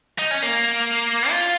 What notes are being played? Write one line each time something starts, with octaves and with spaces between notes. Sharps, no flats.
D#4
C#4
A#3
F4